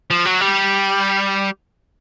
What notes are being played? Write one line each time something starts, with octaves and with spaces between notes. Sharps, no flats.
F3
F#3
G3